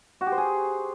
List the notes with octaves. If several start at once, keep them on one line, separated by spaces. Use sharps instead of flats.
F#4
G4
C5
G#4